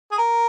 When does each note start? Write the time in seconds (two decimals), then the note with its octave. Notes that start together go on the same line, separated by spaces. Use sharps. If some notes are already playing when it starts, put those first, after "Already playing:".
0.12 G#4
0.18 A#4